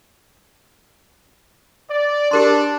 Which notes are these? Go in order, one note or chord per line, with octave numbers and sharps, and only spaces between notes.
D5
D4 G4 A#4 C6